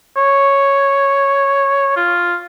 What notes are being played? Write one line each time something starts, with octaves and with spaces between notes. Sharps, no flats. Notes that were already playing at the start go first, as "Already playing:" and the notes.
C#5
F4